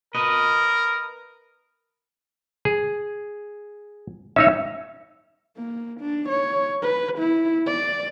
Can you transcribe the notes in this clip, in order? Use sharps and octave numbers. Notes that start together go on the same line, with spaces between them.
A#4 B4 D#5
G#4
C#4 D#4 C#5 E5
A#3
D4
C#5
B4
E4
D5